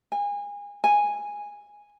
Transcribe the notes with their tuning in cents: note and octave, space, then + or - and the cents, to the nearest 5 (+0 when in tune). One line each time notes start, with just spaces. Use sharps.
G#5 -30
G#5 -10